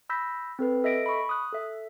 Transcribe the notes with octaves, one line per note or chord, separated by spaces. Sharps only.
B5 E6 G6 A#6 B6
C4 A4 B4
A4 D#5 E5 A#6 D7
B5 C#6
D#6 F#6
A4 E5